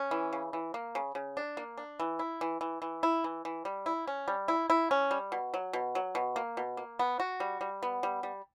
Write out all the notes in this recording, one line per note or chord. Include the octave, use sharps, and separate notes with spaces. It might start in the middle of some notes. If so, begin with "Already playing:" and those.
Already playing: C#4
E3
C#3
E3
A#3
C#3
C#3
D4
A#3
D4
E3
E4
E3
E3
E3
E4
E3
E3
G3
E4
C#4
G3
E4
E4
C#4
G3
B2
F#3
B2
F#3
B2
A#3
B2
A#3
B3
F#4
G3
G3
B3
G3
G3